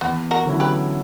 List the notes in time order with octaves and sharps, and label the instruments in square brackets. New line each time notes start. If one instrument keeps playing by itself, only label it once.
[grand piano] E2 [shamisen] B3
[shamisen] F#4 A#4
[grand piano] D3 F#3 C#4 E4
[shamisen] G4 B4